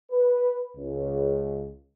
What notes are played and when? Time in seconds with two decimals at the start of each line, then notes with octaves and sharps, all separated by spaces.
0.12 B4
0.77 C#2